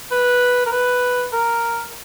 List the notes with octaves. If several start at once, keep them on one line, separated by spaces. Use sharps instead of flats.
B4
A#4
B4
A#4